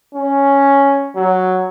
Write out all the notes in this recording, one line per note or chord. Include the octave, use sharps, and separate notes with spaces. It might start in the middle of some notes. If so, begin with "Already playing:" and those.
C#4
F#3